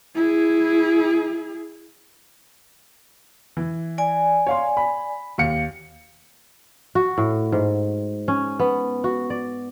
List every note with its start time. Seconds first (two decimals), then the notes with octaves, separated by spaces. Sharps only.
0.15 E4 G#4
3.57 E3
3.98 D5 G#5
4.47 C#5 F5 C6
4.77 B5
5.38 D#2 F5 C#7
6.95 F#4
7.18 A2
7.52 G#2
8.28 C#4
8.59 B3
9.04 F#4
9.30 D5